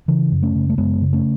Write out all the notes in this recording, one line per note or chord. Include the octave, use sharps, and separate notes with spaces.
C#3 E3
F#2
A3 C#4
C#3
A3
F#2 G#3 B3
C#3
A3 C#4